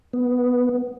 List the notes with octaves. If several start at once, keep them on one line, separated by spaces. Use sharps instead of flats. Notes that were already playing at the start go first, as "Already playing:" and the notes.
B3